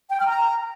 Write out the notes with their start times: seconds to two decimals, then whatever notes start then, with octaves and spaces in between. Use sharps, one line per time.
0.10 G5
0.19 F6
0.28 A#5